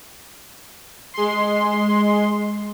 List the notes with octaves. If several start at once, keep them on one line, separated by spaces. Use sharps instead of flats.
G#3 C6